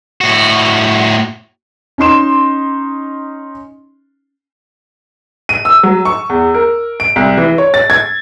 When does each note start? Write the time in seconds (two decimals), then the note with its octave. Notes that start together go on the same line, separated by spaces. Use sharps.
0.21 A2 F#4
1.98 C#4 D#4 C6 E7
5.49 D#7
5.65 E6
5.83 F#3
6.05 C#6
6.30 E2
6.54 A#4
7.00 D7
7.16 C2
7.37 E3
7.58 C#5
7.74 A6
7.90 G#6